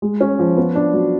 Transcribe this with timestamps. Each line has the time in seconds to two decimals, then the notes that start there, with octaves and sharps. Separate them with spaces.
0.02 G#3
0.21 C#4
0.39 F3
0.57 B3
0.75 D4
0.94 F#3